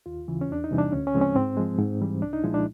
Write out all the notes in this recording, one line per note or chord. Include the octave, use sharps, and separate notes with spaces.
D#2 F4
C#3 E3
C#4
E2 D4
D#4
C3 E3 G3
D4
D2 C#4
C#4
C#3 F3 G#3 C4
C#4
G#2 C4
F3 G#3
G#2
E3 G3
C2 D4
D#4
A#2 F3 G#3 E4
D4